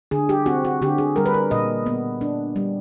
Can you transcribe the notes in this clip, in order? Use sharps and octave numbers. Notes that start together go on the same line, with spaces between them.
D3 G#4
G4
C4 F#4
F#4
D3 G4
G#4
G3 A#4
B4
A#4
A#2 D#5
B3
D4
G3